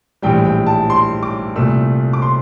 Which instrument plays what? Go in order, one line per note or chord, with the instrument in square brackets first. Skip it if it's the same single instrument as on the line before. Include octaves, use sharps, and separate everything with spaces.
[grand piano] A#1 A2 E3 G3 G5
G5
A5
C6
D6
C2 A#2 A3 E6
D6
C6